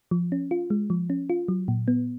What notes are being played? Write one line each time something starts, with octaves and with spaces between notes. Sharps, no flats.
F3
C#4
F4
G#3
F3
C#4
F4
F#3
A#2
B3